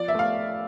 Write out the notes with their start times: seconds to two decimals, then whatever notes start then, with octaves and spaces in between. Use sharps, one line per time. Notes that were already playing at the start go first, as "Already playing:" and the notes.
Already playing: F3 D5
0.08 E5
0.15 A3 F5